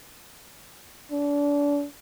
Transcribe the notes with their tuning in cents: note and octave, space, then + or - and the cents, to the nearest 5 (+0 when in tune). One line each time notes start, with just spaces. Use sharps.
D4 -30